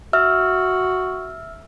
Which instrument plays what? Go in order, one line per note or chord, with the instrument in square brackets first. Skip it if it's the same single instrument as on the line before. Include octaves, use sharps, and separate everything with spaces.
[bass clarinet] F#4 [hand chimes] E5 E6 F6